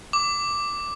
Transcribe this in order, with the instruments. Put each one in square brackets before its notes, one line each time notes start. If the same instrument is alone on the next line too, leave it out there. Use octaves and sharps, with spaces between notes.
[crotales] D6